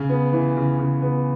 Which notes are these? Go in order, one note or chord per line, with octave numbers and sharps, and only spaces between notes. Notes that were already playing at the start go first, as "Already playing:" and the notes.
Already playing: C#3
B3
E3
C#3
C#3
B3